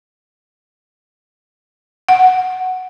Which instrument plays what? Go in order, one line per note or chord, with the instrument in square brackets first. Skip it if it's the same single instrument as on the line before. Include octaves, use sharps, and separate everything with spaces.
[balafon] F#5